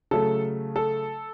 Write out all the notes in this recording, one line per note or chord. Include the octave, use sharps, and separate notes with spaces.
C#3 F#3 A3 A4
A4